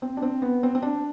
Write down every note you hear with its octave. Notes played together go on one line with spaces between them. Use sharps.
C4
D4
C4
B3
C4
C4
D4